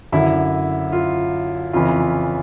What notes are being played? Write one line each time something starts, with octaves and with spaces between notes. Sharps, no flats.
F#2 D3 E4
F4
F2 C#3 E3 F4